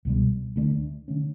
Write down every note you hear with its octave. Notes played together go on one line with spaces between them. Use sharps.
C#2 B2 G3
D2 D3 A3 D4
D3 A3 C#4